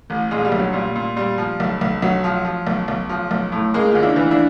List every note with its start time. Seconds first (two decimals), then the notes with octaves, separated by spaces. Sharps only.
0.10 A1
0.31 A#2 G#3
0.45 G3
0.52 B1
0.59 F#3
0.72 A#2 G3
0.95 A#2
1.16 A#2 G3
1.38 F3
1.60 B1
1.81 B1
2.02 B1 F#3
2.24 F3
2.45 F3
2.67 B1
2.88 B1
3.09 F3
3.31 B1
3.52 A2
3.74 C#3 G#3 A#3
3.91 D#2 F4
4.02 D4 E4
4.16 E3
4.31 D4 E4